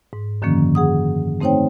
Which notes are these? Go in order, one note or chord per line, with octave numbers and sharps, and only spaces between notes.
G#2
F#2 D3 D#3 F3 A#3 C#4
G#4 F#5 D#6
A3 C4 D#4 C5 C#5 G5